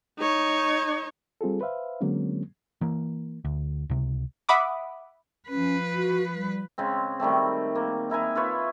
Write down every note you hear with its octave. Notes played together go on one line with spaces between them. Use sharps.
D#4 C#5
G3 C4 F4 G#4 A4
B4 C5 E5 F5
D3 F#3 G#3 A#3 C4 C#4
E3 A#3
D2
C#2 C3
E5 F#5 B5 D6 D#6
F3 C#4 B4
F#4
G3
C#3 G#3 C4
D#3 G3 A3 C4
A#3
D#4 E4 A#4 G#5
E4 F4 B4 C#5